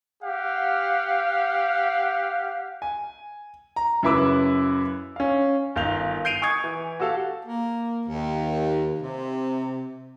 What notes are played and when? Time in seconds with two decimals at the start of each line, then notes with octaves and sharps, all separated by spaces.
0.22 G4 F5 F#5
2.82 G#5
3.76 A#5
4.03 F#2 C#3 E4 B4 D6 E6
5.16 C#4 F5
5.76 G1 D#3 F5 G6 F7
6.25 G6 C7 D7 D#7 F7
6.42 G#5 C#6 D#6 G#6 C#7
6.64 E3
7.00 F#4 G4 A4 F5
7.46 A#3
8.07 D#2
9.00 C3